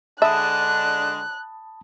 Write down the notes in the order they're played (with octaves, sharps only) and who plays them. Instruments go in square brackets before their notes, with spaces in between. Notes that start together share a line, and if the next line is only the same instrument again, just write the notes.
[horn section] D3 G#3 D4 [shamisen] E5 [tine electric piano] A5 B5 D#6 [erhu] F#6